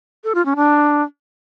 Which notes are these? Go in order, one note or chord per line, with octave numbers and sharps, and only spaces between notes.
A4
F4
C#4
D4